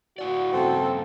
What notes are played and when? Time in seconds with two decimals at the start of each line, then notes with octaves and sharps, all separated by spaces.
0.18 A2 E4 F#4 D5
0.53 G2 C#3 C4 A4